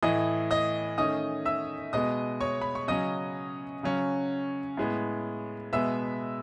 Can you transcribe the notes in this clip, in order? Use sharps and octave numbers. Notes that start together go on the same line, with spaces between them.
A2 E3 A3 D#5 D#6
D#5 D#6
D#3 A3 C#4 D#5 D#6
E5 E6
B2 G#3 B3 D#5 D#6
C#5 C#6
B5
C#6
C#3 F#3 C#4 D#5 D#6
C#3 F#3 C#4
A2 G#3 B3
B2 G#3 B3 E5 E6